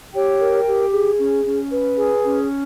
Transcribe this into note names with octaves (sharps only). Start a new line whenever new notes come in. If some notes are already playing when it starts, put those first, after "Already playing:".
G4 C#5 G5
A#4
G4
G#4
C#4
C#4
B4
G#4
C#4